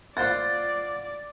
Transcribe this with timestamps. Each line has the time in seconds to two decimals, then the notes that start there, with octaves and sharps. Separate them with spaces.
0.17 F4 C5 D5 F#5 A6